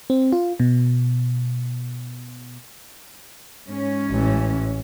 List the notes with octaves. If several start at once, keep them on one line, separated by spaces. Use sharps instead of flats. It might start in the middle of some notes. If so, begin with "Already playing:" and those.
C4
F4
B2
G#2 G#3 C#4
A1 E3